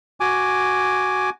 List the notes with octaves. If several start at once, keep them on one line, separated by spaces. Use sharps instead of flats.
F#4 G#5 D6